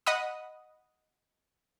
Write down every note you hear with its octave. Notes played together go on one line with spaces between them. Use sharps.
D#5 F#5 B5 D#6